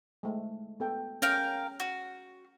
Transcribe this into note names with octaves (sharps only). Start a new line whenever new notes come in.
G#3 A3
B3 A4 G5
C#4 A#4 F5 G5
F#4